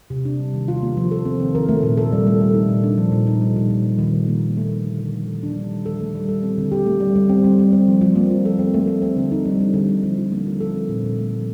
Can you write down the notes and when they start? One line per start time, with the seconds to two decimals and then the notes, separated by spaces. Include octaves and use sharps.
0.10 C3
0.25 D4
0.39 G3
0.54 D#3
0.68 F4
0.82 A#3
0.97 F3
1.11 A4
1.25 C4
1.40 D#3
1.55 A#4
1.69 A3
1.83 A#2
1.97 A4
2.12 G3
2.27 A3
2.41 A3
2.55 D#4
2.69 A#2
2.83 D4
2.98 F3
3.12 A#2
3.27 D#4
3.42 G3
3.56 A#2
3.70 A#2
3.85 G3
3.99 D#3
4.14 D#3
4.28 A#3
4.43 A3
4.57 A3
4.71 D#4
4.85 D3
4.99 D3
5.13 F3
5.28 D#3
5.43 D4
5.57 G3
5.71 D#3
5.86 A4
6.01 A3
6.15 G3
6.29 A4
6.43 C4
6.58 D3
6.72 G4
6.86 A3
7.00 G3
7.15 G3
7.29 C4
7.44 G3
7.59 G3
7.73 C4
7.88 F3
8.01 F3
8.15 A#3
8.31 F3
8.45 A4
8.59 C4
8.74 A3
8.87 A3
9.02 C4
9.17 D3
9.32 D#4
9.45 G3
9.60 D3
9.74 D3
9.89 G3
10.03 F3
10.18 F3
10.32 A#3
10.46 F3
10.61 A4
10.75 C4
10.89 A#2
11.04 A#2
11.18 A3
11.33 F3